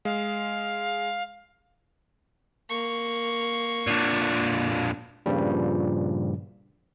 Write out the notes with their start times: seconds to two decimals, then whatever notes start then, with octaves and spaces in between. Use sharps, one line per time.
0.05 G#3 F5
2.70 A#3 C#6
3.87 A#2 D3
5.26 G2 A#2 C#3 F3 G3